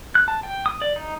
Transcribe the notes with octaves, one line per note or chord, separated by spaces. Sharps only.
F#6
A5
G5
D#6
D5
D#4